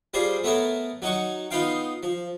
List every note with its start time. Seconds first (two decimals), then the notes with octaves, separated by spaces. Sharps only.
0.14 G3 F4 G#4 C5 D5
0.44 A3 B3 A4 A#4 C#5
1.02 F#3 D#4 F#5 C#6
1.51 B3 D#4 F4 F5 G5
2.03 F3